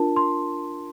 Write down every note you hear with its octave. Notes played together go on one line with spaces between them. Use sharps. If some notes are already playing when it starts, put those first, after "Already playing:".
Already playing: D4 F4 A#4 A5
C6